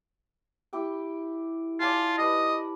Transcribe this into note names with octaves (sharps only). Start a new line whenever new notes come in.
E4 G4 G5
F4 D5 G#5 A5
G4 B4 D#5 B5